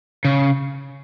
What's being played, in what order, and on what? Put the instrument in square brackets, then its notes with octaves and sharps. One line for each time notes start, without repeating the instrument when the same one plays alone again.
[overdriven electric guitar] C#3